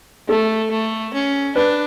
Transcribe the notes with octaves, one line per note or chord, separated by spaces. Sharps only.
A3 A4
A3
C#4
D4 B4